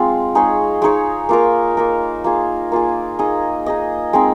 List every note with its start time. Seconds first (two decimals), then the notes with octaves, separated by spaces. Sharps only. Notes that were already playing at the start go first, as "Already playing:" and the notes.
Already playing: G#3 C4 F4
0.35 G#3 D#4 G#4 C#5
0.82 G#3 D#4 G#4 C#5
1.29 A#3 F4 A#4
1.77 A#3 F4 A#4
2.24 A#3 F4 G#4
2.72 A#3 F4 G#4
3.19 D#4 G#4 D#5
3.66 D#4 G#4 D#5
4.13 G#3 C4 D#4